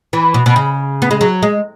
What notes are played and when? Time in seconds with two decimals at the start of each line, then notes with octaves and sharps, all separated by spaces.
0.13 E3
0.34 B2
0.46 B2
0.56 C#3
1.02 B3
1.11 G#3
1.21 F#3
1.43 G#3